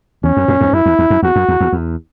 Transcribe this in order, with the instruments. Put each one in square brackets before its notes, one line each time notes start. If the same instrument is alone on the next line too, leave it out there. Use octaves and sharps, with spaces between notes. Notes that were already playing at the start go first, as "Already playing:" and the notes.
[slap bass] E2 [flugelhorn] C#4
[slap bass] F#2
F#2 A#2
E2 G#2
[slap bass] F#2 [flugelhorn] E4
[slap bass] E2
E2
F#2
[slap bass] E2 [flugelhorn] F#4
[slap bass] F#2
E2
E2
E2